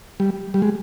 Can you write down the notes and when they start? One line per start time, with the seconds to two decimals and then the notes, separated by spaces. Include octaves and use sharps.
0.20 G3
0.54 G3
0.62 G#3